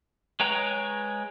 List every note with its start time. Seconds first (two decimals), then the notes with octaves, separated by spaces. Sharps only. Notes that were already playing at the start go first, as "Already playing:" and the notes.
0.40 G#3 B4 C#5 G5 A#5